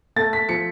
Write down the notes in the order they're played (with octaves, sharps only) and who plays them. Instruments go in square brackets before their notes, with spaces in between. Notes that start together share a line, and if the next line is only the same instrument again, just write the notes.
[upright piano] A3 A6
B6
F3 C#7